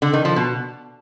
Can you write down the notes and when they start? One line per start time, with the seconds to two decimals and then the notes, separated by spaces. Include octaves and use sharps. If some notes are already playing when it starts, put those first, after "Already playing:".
0.02 D3
0.13 D#3
0.25 F3
0.36 B2